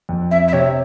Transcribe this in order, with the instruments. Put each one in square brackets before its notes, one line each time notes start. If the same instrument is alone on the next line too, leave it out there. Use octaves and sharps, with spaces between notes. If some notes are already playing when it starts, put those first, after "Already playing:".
[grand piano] F2
[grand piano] C4 [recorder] E5
[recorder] E5
[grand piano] C3 [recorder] C#5